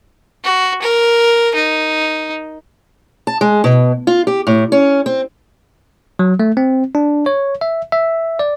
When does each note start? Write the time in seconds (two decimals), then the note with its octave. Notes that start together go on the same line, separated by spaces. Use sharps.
0.44 F#4
0.82 A#4
1.55 D#4
3.27 A5
3.41 G#3
3.64 B2
4.07 F4
4.27 G4
4.47 A2
4.72 C#4
5.06 C4
6.19 F#3
6.40 A3
6.57 C4
6.95 D4
7.26 C#5
7.61 E5
7.92 E5
8.39 D5